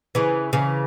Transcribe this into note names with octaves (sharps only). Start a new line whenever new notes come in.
C#3 E3
C#3 E3